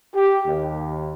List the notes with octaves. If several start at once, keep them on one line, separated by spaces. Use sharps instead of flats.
G4
D#2